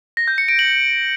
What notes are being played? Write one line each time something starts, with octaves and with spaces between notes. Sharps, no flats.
A#6
G6
C#7
D7
F#7